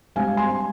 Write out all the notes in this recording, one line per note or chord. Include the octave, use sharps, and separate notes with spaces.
G#1 G#2 G3 C4 F5 G#5
G#5 C6